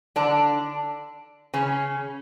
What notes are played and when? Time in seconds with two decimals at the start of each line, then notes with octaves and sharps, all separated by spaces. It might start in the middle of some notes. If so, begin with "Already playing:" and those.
0.16 D3 D4
1.54 C#3 C#4